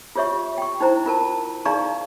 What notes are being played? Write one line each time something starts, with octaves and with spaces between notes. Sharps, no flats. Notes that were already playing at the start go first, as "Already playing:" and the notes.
F4 G4 C#5 E5 C#6
G5 C#6
D#4 E4 C5 A#5
F4 A#4 A5
D#4 G#4 D5 F5 A#5 C#6